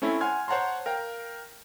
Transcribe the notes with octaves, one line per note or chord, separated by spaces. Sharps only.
A3 C4 C#4 E4
F#5 G#5 C6 F6 G#6
C5 C#5 F#5 A5 A#5 C6
A#4 F5 G5